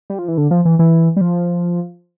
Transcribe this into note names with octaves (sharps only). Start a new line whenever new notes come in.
G3
F3
E3
D3
F3
E3
E3
G3
F3